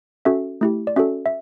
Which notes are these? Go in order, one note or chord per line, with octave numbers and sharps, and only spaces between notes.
C#4 F#4 A4 E5
A3 E4 G4
D5
C#4 F#4 A4 E5
E5